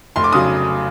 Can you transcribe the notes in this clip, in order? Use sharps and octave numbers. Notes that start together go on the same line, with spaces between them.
F1 C6
D6
C#3 F#3 D#6